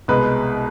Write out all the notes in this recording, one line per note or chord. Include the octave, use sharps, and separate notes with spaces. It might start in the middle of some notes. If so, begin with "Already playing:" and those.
C2 B2 G#3 B4